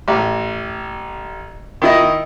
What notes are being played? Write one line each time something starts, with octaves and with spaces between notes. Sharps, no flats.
A1
D#3 E4 D#5